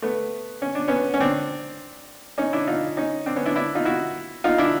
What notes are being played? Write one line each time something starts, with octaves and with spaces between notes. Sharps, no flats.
A3 B3
C#4
D4
B3 C#4
C#4
C4 D4
C#4 D#4
D4 E4
D#4 F4
C#4 D#4
C4 D4
B3 C#4
D4 E4
D4 E4
D#4 F4
E4 F#4
D#4 F4
D4 E4